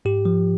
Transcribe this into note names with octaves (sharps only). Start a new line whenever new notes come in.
G#2 G4
F3